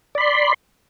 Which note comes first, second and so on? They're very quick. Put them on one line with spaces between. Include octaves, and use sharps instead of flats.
D5 B5 C6